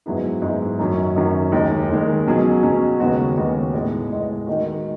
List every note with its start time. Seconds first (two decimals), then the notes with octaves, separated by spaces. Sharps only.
0.06 G#2 F#3 B3 E4 G#4
0.42 G#2 F#3 B3 E4 G#4
0.79 F#2 D#3 F#3 C#4
1.16 F#2 D#3 F#3 C#4
1.52 D#2 D#3 G#3
1.89 D#2 D#3 G#3
2.26 B2 F#3 C#4 G#4
2.63 B2 F#3 C#4 G#4
3.00 D#2 C#3 G#3 B3 F#4
3.36 D#2 C#3 G#3 B3 F#4
3.73 A2 G#3 B3
4.10 A2 G#3 B3
4.47 D#3 G#3 D#4 F#4